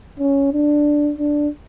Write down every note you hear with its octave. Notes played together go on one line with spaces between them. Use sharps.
C#4
D4
D4